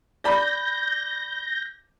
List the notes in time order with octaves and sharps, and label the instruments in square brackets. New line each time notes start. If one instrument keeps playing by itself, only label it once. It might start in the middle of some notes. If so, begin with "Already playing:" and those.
[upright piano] D5 B5 [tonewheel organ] G6 A#6